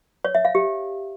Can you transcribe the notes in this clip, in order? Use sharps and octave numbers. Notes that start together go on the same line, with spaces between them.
C#5
E5
F5
G4